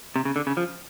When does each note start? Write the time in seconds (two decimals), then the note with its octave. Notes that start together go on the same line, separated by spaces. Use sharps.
0.16 C3
0.25 C#3
0.36 D3
0.47 C#3
0.57 F3